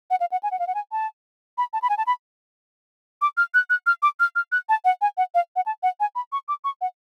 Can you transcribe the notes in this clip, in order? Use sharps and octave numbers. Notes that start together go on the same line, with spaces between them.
F#5
F5
F#5
G#5
F#5
F5
F#5
G#5
A5
B5
A5
B5
G#5
A5
B5
D6
F6
F#6
F#6
F6
D6
F6
F6
F#6
A5
F#5
G#5
F#5
F5
F#5
A5
F#5
G#5
B5
C#6
D6
C#6
F#5